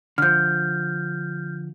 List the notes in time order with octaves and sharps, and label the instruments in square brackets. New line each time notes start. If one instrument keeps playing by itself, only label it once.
[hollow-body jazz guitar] D3 F3 [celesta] F6 G6